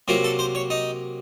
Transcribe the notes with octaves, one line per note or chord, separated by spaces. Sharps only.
C3 F#3 A#3 F4
A4
C5
C#5
D#4